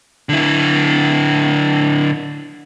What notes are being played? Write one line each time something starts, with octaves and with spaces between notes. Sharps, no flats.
D3 E4